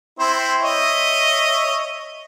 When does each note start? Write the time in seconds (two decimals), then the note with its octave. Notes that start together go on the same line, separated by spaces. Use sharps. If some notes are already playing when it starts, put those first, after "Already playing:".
0.19 C4 E4 C5
0.62 C#5 D#5 E5